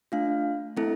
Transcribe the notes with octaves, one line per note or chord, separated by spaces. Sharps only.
A3 D4 F4 F5
A3 C4 E4 A4